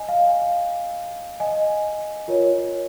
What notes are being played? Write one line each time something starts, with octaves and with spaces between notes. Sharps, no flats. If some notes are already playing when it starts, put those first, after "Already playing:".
Already playing: D#5 G#5
F5
D#5 G#5
F4 A#4 C#5